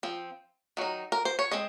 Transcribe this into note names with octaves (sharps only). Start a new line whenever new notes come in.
F3 C4
D#3 F#3 D#4
A#4
C5
C#5
G#3 C4 D#5